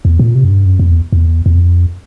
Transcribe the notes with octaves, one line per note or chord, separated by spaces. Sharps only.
E2
A#2
C3
F#2
G2
F#2
F2
E2
E2
E2
F2